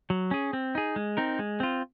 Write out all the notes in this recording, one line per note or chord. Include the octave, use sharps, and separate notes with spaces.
F#3
C#4 G#4
C4
D#4 G#4
G#3
C4 D#4 A#4
G#3
C4 F4